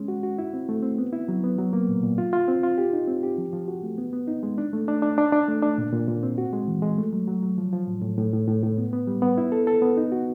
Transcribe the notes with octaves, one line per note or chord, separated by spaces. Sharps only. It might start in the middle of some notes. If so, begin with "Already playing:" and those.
Already playing: G#3 C#4
F#4
F#4
E4
C4
A3
C4
B3
E4
F#3
B3
F#3
A#3
A#2
A#2
F4
F4
C4
F4
G4
D#4
C4
G4
F3
F3
F#4
A3
B3
B3
D#4
G#3
D4
A3
D4
D4
D4
D4
A3
D4
A#2
A#2
A#2
C4
F#4
G#3
E3
G#3
A3
F#3
F#3
F#3
F3
F3
A2
A2
A2
A2
A2
A2
B3
B3
G3
B3
E4
A4
A4
B3
D#4
F#4